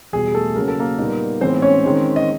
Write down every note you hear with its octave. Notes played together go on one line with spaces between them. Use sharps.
E2 B2 G3 G#4
A3 A4
C#3 F#3 A#3 C#4 A#4
A4
A#3 A#4
A#2 G3 B3 D#4
A2 E3 G#3 B3 C4 D#4 C5
C#4 C#5
D#3 G#3 C4 D#4
D#5